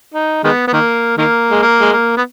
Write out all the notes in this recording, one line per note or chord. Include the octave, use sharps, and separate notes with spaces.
D#4
D#3 G#3 B3
B3
D#3 A#3
D#3 A#3
G#3
A#3
G#3
A#3
B3